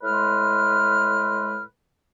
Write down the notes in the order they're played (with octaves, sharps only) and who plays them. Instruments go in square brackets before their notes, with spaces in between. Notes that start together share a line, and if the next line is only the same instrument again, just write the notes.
[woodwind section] A2 G#3 B4 F6